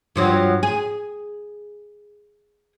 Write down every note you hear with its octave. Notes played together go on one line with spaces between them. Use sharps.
G2 F3 F#3
G#4